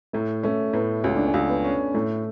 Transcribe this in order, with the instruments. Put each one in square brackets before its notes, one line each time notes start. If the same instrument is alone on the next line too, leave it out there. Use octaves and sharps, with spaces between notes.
[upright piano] A2 [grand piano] A3
[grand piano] A3 [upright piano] C#4
[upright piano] A2 [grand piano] B3
[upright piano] C#2 [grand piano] C#4
[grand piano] D4
C#4
[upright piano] C#2
[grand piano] B3
[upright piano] C#4
[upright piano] A2 [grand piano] A3